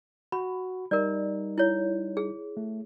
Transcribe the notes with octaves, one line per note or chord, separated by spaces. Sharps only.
F#4 B5
G3 D#4 A#4 D5
E4 C#5
G#4
A3